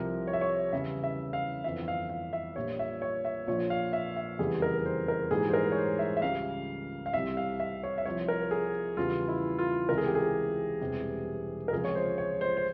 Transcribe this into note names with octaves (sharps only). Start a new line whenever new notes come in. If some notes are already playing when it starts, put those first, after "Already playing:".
Already playing: C2 C3 F3 A#4
C#5
E5
C#5
E2 C#3 G3 E5
E5
F5
G1 F2 E3 E5
F5
F5
E5
A#1 A#2 G3 C#5
E5
C#5
E5
A#1 A#2 F3 C#5
F5
E5
E5
F1 E2 C#3 E3 G3 G#4
A#4
C5
A#4
A#1 G#2 E3 G3 G#4
C5
A#4
C#5
C5
E5
E5
C#2 C#3 G3 F5
F5
C2 C3 G3 E5
F5
E5
C#5
E5
C2 C3 F3 C#5
A#4
G#4
E2 C#3 G3 F4
E4
F4
C#2 C3 E3 A#4
G#4
G4
G#4
E1 E2 C3 G3
A#4
C#2 C3 F3 G#4
C#5
C5
C#5
C5
C5